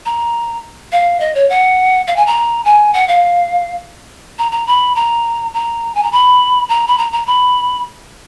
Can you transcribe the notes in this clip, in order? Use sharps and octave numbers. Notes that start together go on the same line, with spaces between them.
A#5
F5
D#5
C#5
F#5
F5
G#5
A#5
G#5
F#5
F5
A#5
A#5
B5
A#5
A#5
G#5
A#5
B5
A#5
B5
A#5
A#5
B5